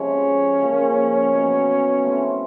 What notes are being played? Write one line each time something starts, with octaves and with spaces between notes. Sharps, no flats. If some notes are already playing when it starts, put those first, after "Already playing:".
Already playing: C3 F3 G#3 C#4
C#3 F3 A#3
B2 F#3 B3
A3 C4 E4